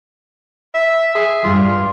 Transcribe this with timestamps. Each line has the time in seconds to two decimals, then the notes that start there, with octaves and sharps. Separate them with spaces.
0.74 E5
1.15 G#4
1.44 G2 G3 F4